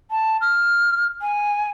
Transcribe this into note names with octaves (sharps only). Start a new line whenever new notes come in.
A5
F6
G#5